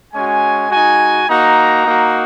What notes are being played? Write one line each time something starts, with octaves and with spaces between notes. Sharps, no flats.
G#3 C#4 F#4 G#5
G#3 D#4 F#4 G#5
A#3 D#4 F#4 A#5
A#3 D#4 F#4